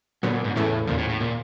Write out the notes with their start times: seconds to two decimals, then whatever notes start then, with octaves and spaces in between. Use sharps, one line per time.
0.23 A#2 D3 F#3 B3
0.34 A#2
0.44 G#2
0.55 E2 A2 C#3 E3 A3
0.87 D#2 A#2 C#3 F3
0.98 A2
1.09 A2
1.20 A#2